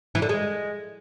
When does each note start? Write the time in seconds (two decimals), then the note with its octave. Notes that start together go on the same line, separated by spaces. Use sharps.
0.15 E3
0.22 D3
0.29 G#3